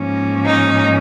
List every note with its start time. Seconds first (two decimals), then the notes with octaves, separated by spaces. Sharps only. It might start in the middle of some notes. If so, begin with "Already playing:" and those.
Already playing: G#2 F3 A#3 C#4
0.46 D#4